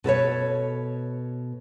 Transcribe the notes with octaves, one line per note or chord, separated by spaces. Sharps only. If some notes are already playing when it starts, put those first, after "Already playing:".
B2 A4 B4 C#5